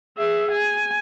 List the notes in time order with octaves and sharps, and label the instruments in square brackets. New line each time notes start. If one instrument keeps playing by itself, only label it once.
[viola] G#4 E5
G#5